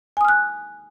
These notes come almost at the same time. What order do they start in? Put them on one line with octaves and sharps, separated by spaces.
G#5 D#6 F6 F#6